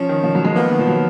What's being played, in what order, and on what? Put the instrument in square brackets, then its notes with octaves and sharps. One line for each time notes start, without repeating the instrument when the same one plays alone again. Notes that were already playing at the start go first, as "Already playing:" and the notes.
Already playing: [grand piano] F3 [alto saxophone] C#4
[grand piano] D#3
F3
F#3
G#3
[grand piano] A#3 [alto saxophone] B3
[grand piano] D#3
F3
F#3